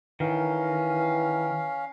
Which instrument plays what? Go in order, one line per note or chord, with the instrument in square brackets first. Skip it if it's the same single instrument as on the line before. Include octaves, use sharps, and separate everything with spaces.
[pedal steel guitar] D#3 [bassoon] E3 [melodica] C#4 F5